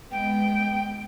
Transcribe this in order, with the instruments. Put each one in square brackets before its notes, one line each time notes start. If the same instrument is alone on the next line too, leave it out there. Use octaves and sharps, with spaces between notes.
[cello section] G#3 B3 [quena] G5